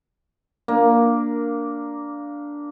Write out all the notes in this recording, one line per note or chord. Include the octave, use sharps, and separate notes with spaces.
A#3 D4